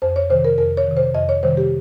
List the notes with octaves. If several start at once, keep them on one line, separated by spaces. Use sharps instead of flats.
F2 C5
C#5
C3 D#3 C5
A#4
F2 A#4
C#5
C3 D#3
C5
F2 D#5
C#5
C3 D#3 G3 C5
G4